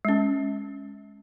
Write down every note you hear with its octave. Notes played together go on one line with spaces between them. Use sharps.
G#3 C#4